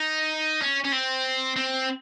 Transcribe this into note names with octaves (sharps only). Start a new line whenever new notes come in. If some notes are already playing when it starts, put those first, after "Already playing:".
Already playing: D#4
C#4
C#4
C4
C4